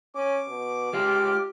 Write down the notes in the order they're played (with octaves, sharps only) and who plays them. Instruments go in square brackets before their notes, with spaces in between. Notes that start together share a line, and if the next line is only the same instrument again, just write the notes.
[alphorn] C#4 [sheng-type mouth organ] D6
[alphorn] B2
[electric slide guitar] G#3 F4 [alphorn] G4 [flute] F6